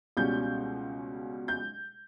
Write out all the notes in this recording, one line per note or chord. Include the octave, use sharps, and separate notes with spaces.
C#2 B2 G3 C#4 G6
G6